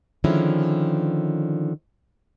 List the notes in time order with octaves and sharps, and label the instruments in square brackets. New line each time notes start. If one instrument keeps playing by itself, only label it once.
[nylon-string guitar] D3 D#3 F3 G#3 C#4 E4